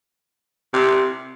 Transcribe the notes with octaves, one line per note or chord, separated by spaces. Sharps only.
C3